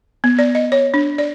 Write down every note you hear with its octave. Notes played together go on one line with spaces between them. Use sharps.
B3
D5
D#5
C#5
D4
D5